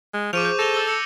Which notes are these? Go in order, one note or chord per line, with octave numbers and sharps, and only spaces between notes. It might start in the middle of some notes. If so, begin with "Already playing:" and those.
G#3
F3 G#4 C5 C#6 D6 D#7 F7
G6
A4 A#6 F7 G7
E6 A6 G7
E6 C#7